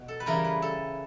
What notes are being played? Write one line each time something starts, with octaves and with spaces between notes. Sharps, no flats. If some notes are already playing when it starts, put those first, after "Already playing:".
Already playing: B2
A4
B4
C#3 E3 G3 A#4
B4
A4